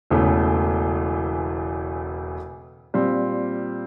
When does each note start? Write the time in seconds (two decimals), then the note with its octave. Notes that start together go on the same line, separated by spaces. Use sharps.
0.11 E1 E2 C#3 E3 A3
2.94 A#2 G3 C4